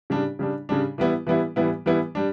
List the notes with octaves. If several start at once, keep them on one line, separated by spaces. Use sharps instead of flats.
C#3 G3 D4
C#3 G3 D4
C#3 G3 D4
E3 G3 B3 E4
E3 G3 B3 E4
E3 G3 B3 E4
E3 G3 B3 E4
G3 D4